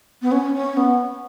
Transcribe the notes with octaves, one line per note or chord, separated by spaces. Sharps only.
B3
C#4
C#4
B3